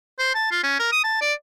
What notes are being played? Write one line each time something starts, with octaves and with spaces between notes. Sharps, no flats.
C5
A5
F4
C#4
A#4
D#6
A5
D5